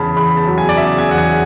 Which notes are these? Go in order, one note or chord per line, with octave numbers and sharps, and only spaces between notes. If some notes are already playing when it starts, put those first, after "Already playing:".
Already playing: E2 C#3 A5 B5
E2 B5
A5
F#3
G#5
D5
C#3 E5
G#5
E2 F#5
G#5